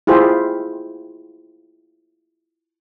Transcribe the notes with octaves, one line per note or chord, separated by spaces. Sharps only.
E4 F4 G4 G#4 C5